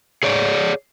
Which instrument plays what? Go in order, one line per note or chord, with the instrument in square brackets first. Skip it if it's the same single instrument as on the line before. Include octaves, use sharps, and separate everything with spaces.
[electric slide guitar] G#4 C#5 D5